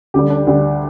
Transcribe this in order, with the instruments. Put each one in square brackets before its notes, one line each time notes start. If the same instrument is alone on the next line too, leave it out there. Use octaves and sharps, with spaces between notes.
[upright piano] D2 D3 G3 G4
D4
D2 D3 G3